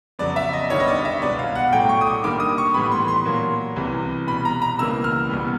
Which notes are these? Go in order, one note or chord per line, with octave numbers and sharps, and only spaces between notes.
F2 C#3 F#3 B3 D5
E5
D#5
G2 D#3 G3 B3 C#5
D#5
D5
E5
C2 B2 G#3 B3 D5
F5
F#5
A2 F#3 A3 G5
C#6
D#6
D6
G2 D#3 G3 A#3 D6
D#6
C#6
A2 E3 G3 B3 B5
C6
C6
A#2 F#3 A#3
C2 C3 E3
B2 G3 B3 B5
A#5
A#5
C#2 C#3 E3 G3 A#3 E6
F6
C2 B2 G3 B3